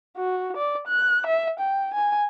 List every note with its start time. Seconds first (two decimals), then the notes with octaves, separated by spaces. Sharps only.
0.17 F#4
0.57 D5
0.87 F#6
1.27 E5
1.59 G5
1.94 G#5